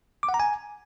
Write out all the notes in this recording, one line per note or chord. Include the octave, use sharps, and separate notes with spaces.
D6
F#5
A#5
G#5